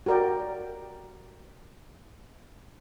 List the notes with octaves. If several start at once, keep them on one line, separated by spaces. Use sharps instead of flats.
F#4 G4 A#4 D5 G5